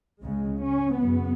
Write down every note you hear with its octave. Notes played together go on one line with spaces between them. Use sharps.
C#2 C#3 G#3
C#4
F#2 C#3 B3